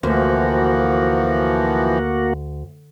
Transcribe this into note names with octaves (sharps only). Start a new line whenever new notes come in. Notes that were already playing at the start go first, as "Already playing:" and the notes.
D2 E3 F3 A#3 F#4